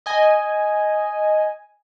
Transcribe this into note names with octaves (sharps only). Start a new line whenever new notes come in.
D#5 G#5